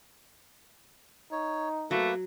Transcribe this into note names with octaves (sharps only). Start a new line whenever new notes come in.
D#4 C#5
F#3 A3 A#3 B4